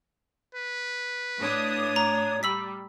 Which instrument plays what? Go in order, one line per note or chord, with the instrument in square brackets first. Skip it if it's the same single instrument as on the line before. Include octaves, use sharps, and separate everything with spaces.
[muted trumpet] B4
[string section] A2 D4 D#6 [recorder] C#5
[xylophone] A#5
[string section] G3 [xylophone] B5 E6 B6